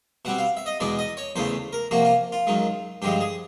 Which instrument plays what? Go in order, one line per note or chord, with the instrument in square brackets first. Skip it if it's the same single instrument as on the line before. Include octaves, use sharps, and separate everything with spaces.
[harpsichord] B2 G3 C4 F#5
F5
E5
D#5
E2 B2 G#3 B3 D5
D#5
C#5
E2 C#3 E3 A3 C5
A#4
C3 F3 A#3 F#4
F4
F4
F#2 D#3 G#3
G2 D3 F3 G#3 G4
G#4